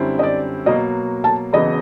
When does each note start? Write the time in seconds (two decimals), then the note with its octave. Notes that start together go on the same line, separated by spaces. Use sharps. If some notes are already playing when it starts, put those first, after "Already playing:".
Already playing: F#2 D3 G3 C4 E4
0.19 D#5
0.23 D5
0.66 B2 F#3 A#3 D#5
1.24 A5
1.53 E1 E2 C#3 F#3 B3 D#5